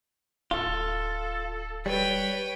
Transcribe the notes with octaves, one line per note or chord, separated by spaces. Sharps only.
D1 F4 A4
G3 B4 C#5 G5